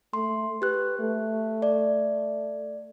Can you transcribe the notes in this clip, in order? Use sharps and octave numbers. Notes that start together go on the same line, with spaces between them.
A3 C6
G4 B4 F#6
A3
D5